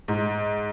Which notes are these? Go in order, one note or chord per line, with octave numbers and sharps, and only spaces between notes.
G#2